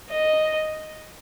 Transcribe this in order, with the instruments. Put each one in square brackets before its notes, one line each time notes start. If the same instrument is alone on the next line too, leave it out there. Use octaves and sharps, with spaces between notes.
[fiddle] D#5